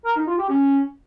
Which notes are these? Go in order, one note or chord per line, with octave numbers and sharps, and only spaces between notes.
A#4
D#4
F4
G4
C#4